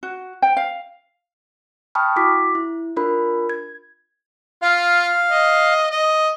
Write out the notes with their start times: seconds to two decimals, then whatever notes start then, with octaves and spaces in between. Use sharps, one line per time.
0.03 F#4
0.42 G5
0.57 F5
1.95 G5 A5 B5 C#6 D#6 F6
2.16 E4 F#4 D6 B6
2.55 E4
2.97 D4 F4 A#4 B5
3.50 G#6
4.62 F4 F5
5.30 D#5
5.91 D#5